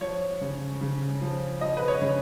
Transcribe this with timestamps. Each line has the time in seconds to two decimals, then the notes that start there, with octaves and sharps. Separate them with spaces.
0.01 F3 C#5
0.41 C#3
0.81 C#3
1.21 F3
1.61 F3 D#5
1.77 B4
1.88 C#5
2.02 C#3